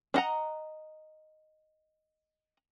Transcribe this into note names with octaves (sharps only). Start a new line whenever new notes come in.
D4 D#5 F#5 A#5